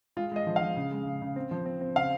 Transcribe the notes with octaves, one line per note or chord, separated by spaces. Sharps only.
G#3 F4
G#3 D#5
F3
F5
F3
C#3
G#3
C#3
C#3
C4
F3
C4
C4
C#3 F5